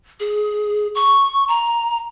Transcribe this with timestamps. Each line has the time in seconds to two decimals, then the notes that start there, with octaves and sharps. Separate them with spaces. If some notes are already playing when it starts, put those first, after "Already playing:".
0.20 G#4
0.95 C#6
1.48 A#5